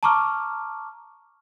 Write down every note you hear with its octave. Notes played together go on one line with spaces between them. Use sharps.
A5 A#5 C#6 D6 F6